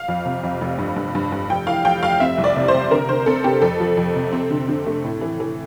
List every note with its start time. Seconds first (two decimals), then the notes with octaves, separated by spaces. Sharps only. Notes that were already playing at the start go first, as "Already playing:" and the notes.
Already playing: F5
0.08 F2
0.26 C3
0.43 F2
0.61 F1
0.78 G2
0.96 G2
1.15 G2
1.32 G2
1.50 F1 G5
1.67 E3 F5
1.85 F1 G5
2.03 F1 F5
2.20 C4 E5
2.38 C2
2.44 D5
2.57 C3
2.68 C5
2.74 C3
2.91 D3 A#4
3.09 D3 C5
3.26 C4 A4
3.44 C4 G4
3.62 F2 A4
3.80 F3
3.97 F2
4.15 C3
4.32 C4
4.51 D3
4.68 D3
4.86 A3
5.04 A2
5.21 E3
5.40 E3